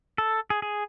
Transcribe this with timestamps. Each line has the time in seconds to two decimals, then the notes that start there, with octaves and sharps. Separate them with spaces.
0.18 A4
0.50 G#4
0.62 G#4